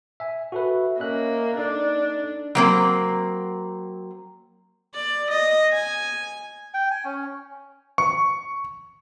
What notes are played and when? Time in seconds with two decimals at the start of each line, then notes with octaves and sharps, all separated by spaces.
0.20 E5 G#5
0.52 F#4 A4 B4 E5
0.99 A#3 C#4 D#5 E5 F#6
1.57 D4 D#4 A4 D5
2.55 F#3 A#3 C4
4.95 D5
5.31 D#5
5.72 G#5
6.74 G5
6.91 G#5
7.05 C#4
7.98 C#6